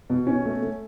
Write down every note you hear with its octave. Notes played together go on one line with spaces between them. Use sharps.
B2
C#4
A3
A3